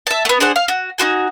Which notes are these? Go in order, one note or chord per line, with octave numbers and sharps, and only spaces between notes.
E5 A5
A3 B3
D4 G#4 C5 F#5
F5
F#4
D#4 F4 F#4 G#5